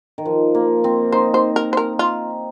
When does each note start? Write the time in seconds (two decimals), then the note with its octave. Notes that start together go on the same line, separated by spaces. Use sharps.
0.18 D#3
0.26 F3
0.55 A#3
0.84 C4
1.12 D#4 C5
1.34 C5
1.56 A#4
1.73 C5
1.77 A#4
1.99 F4